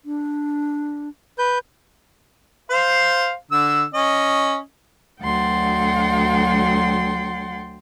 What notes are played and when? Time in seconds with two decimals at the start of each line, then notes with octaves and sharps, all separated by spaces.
0.05 D4
1.38 B4 G6
2.70 C5 F5
3.51 D3 E6
3.94 C#4 D#5
5.21 D2 F#3 F#5 G5 C6 A6